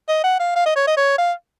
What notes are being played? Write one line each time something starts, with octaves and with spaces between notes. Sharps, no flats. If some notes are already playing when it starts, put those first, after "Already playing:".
D#5
F#5
F5
F5
D#5
C#5
D#5
C#5
F5